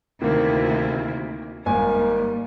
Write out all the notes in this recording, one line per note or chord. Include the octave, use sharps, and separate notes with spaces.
D2 C3 D#3 A#3 E4
G#1 G3 A#3 G#5